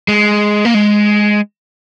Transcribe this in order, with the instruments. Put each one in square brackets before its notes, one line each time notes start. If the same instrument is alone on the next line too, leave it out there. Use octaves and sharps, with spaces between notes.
[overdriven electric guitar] G#3
A#3
G#3